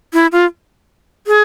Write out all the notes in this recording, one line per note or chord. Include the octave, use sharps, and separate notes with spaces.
E4
F4
G#4